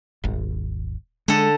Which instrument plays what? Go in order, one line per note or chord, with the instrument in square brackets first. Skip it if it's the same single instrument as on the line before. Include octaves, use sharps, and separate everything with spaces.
[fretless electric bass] D#1 G#1
[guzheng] D3 A4 [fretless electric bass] G#3